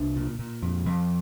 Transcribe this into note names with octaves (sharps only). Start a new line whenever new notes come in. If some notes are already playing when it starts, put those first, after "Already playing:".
Already playing: C2 D4
A#2
A#2
F2
F2